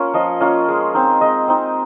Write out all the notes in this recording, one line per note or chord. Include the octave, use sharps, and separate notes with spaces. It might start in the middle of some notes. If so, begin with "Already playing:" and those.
Already playing: A#3 C#4 F4 C#5
F3 D#5
A#3 C#4 F4
G#3
C4 D#4
G#3 D#5
C4 D#4